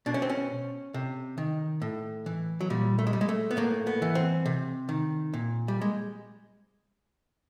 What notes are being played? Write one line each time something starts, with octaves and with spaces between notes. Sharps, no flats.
B2 D4
C#4
C4
C#4
C3
D#3
A2
E3
F#3
A#2 G3
A3
G#3
G3
G#3
A3
B3
A2 A#3
B3
E3
C4
C3
D#3
A#2
G3
G#3